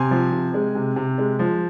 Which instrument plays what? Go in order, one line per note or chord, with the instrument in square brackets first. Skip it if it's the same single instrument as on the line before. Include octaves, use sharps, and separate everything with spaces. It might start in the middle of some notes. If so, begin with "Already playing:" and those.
Already playing: [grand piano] C3 G#5 C6
F3
C3
G#3
C3
C3
G#3
F3